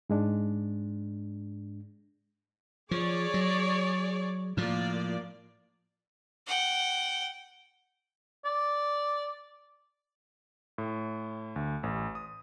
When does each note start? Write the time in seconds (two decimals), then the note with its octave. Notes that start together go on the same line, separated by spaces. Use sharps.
0.10 G#2 G#3 D4
2.91 F3 G#4 C#5 D5
3.34 F#3
4.57 A2 F3 A#3 F4 D5
6.47 F#5 G5
8.45 D5
10.78 A2
11.56 D2
11.83 A1
12.15 D#6